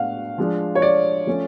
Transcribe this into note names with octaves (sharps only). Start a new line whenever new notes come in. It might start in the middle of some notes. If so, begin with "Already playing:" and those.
Already playing: A2 G#3 B3 D4 F5 F#5
F3 G#3 D4
C#5
D5
F3 A3 C#4